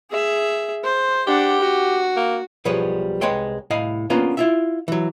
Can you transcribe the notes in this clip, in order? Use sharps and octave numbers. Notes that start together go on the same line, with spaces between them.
G#4 E5
C5
D4 G4 F#5
F#4
A#3
B1 F3 G3 G#4 B4 C#5
C2 G#3 B4 C#5 G5 C6
C2 A2 D#5 F5 B5
A#3 B3 C#4 D4 F4 B4
E4 F4 E5
E3 F#3